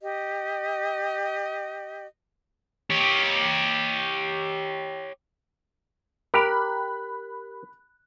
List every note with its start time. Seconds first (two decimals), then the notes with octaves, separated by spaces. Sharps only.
0.01 G4 D#5
2.90 G4 C#5
6.34 G4 A#4 B5 F#6